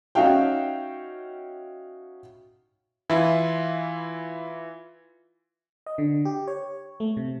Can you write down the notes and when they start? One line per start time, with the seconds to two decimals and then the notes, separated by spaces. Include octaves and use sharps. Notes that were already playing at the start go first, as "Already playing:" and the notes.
0.15 C#4 D#4 F#4 E5 F5 G5
3.10 E3 E4 F4
5.86 D#5
5.98 D3
6.25 G4
6.48 C#5
7.00 A3
7.17 C3